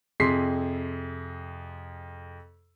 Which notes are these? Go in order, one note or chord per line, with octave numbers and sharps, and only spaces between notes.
F2 C3 G#4 C6 B6 C7